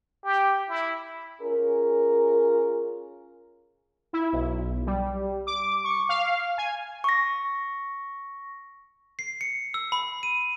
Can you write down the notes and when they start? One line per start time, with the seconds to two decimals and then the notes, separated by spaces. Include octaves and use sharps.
0.24 G4
0.69 E4
1.41 C#4 F4 G#4 A#4
4.13 E4
4.33 B1
4.87 G3
5.47 D6
5.84 C#6
6.09 F5
6.58 G#5
7.04 C#6 A#6
9.19 C7
9.41 C#7
9.74 E6
9.92 B5
10.23 D#7